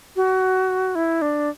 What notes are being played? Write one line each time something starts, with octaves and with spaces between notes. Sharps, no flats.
F#4
E4
D4